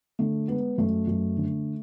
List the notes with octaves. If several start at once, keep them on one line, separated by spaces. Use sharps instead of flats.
D3 A3
G#3 B3
F#2 A3
F#2
D3